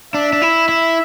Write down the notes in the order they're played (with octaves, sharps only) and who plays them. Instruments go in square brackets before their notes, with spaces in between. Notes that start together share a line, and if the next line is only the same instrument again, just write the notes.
[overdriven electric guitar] D4 [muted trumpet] E5
[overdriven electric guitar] D4
E4
E4